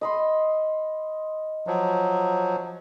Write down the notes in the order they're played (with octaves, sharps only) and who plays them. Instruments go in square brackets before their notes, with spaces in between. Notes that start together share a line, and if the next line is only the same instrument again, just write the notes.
[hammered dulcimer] D#5 B5 C6
[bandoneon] F3 F#3